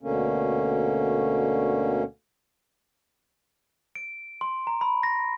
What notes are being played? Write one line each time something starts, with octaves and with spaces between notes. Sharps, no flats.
D2 B2 D3 A#3 C#4
D7
C6
A#5
B5
A#6